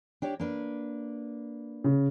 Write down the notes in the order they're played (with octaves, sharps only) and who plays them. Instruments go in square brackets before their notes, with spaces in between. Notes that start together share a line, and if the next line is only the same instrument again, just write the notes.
[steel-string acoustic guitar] D4 G4 C#5
A#3 D4 B4
[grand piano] C#3